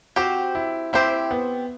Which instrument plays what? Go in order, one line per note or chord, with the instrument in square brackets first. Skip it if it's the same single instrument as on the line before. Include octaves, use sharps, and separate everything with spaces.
[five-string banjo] C4 G4 C5 [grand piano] F#4
[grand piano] E4
[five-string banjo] C4 G4 C5 [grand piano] E4
[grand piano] B3